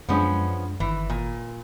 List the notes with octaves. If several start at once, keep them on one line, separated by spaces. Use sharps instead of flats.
F#2 F3 G#3 B3 C#4 D4
G1 D#3 E3
A#2